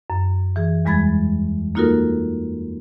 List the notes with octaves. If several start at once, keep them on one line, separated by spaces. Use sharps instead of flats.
F#2
E3 G#4
E2 G3 G#3 B5 G#6 A6
A#3 D#4 F4 F#4 A4 A#4